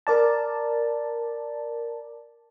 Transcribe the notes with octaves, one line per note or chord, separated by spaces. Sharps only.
A#4 D5 A5